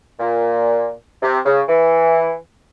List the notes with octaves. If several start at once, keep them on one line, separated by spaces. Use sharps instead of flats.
A#2
C3
C#3
E3